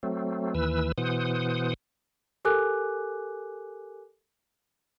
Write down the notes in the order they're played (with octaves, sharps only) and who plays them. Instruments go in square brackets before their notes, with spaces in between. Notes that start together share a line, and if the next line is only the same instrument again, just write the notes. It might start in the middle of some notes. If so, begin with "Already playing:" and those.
[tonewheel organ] F#3 A3 C4
D#2 E3 B4 E6
B2 E3 C5 F#5 D#6
[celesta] G4 A4 A#4 G#5 D6 F#6